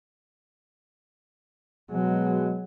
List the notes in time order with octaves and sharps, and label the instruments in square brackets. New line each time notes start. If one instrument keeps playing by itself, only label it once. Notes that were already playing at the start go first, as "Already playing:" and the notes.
[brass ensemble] B2 G#3 [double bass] F#3